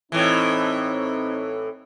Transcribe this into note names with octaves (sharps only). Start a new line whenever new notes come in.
A2 E3 C4 D#4